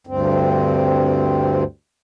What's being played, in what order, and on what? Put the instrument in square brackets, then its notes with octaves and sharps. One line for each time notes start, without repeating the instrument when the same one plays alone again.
[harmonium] D2 G2 C4